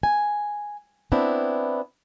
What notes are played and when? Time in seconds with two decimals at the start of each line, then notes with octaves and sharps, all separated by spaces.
0.03 G#5
1.12 B3 C4 D4 E4